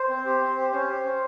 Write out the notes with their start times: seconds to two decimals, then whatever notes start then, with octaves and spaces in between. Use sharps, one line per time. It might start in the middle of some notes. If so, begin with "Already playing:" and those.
Already playing: C5
0.09 C4
0.25 G4
0.41 C4
0.57 G4
0.72 C#4 C5
0.89 G4
1.04 C#4